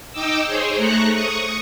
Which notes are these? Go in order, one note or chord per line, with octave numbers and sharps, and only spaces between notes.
D#4 D#5 G5 D6 E6
G#4 C5 C#5
A3 A#5 C#6 F#6
C#6 D#6